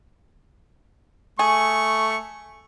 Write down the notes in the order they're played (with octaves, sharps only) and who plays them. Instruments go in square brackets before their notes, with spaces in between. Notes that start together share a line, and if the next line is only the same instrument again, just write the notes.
[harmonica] A3 C#6 [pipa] G#4